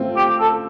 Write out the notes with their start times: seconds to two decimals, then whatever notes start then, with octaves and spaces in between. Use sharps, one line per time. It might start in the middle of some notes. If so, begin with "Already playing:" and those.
Already playing: A3 C4 F4
0.16 G4
0.39 A4